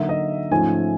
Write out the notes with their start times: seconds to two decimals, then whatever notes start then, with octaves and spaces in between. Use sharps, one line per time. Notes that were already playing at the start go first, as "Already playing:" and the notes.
Already playing: D3 F#3 A#3 D#4 E5
0.09 D#5
0.51 G#2 F3 A3 C#4 F4 G#5